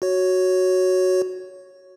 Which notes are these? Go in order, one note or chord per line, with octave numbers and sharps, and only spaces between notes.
F#4 C#5